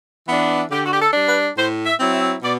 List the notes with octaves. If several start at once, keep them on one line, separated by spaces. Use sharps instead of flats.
E3 B3 D4
D3 G4
F#4
G4
A4
G3 D4
B4
A2 C5
E5
F#3 C4 E4
E5
B2 D5